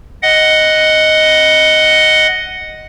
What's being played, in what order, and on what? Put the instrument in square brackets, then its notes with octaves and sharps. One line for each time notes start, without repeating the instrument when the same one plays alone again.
[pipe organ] D#5 F#5